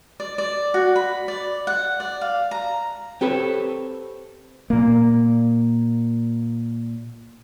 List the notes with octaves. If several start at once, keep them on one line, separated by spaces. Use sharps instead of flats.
D5
D5
F#4
B5
D5
F#5
D5
F5
A#5
C4 G4 A4 B4 C#5
A#2 A#3